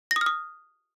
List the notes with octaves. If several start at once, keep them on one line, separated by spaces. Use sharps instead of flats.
A#6
D#6
F6
D#6